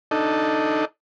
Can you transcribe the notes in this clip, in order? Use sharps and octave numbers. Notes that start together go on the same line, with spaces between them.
D4 D#4 A4